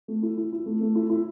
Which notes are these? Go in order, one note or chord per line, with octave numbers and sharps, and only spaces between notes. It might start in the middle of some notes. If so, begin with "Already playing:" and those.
A3
E4
E4
E4
A3
A3
E4
E4